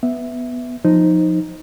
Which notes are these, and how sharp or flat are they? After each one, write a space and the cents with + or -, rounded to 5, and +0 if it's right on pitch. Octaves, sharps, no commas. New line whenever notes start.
B3 +0 E5 +0
F3 +20 D#4 +0 C5 +0